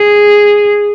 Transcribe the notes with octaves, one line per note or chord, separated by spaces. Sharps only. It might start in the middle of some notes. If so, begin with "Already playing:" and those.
Already playing: G#4